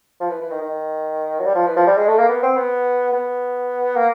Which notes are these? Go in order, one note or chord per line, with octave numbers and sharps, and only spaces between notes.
F3
E3
E3
D#3
D#3
F#3
G3
F3
E3
F3
G3
G#3
A3
A#3
B3
C4
B3
B3
A#3